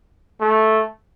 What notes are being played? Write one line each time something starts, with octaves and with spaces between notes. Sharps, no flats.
A3